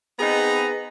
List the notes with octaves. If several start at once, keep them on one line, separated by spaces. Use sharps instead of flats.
B3 C4 D#4 G#4 B4 A#5